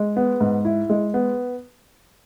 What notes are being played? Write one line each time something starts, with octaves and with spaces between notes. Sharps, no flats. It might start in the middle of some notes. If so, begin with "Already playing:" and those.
Already playing: G#3
B3
G#2
E4
G#3
B3